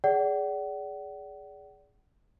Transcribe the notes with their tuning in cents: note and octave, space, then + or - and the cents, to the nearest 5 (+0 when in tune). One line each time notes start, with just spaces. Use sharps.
G#4 +0 D5 -25 F#5 +40